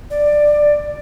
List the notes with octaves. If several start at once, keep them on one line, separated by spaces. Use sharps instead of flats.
D5